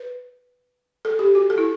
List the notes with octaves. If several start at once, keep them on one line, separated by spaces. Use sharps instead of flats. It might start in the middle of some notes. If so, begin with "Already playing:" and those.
Already playing: B4
A4
G4
F#4
A4
E4